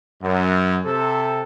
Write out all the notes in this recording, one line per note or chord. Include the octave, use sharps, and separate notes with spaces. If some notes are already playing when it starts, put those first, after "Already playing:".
F#2
C3 A4